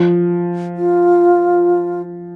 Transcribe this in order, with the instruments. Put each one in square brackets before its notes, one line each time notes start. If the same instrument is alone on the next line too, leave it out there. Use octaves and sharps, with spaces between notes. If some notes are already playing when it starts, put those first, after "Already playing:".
Already playing: [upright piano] F3
[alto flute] F4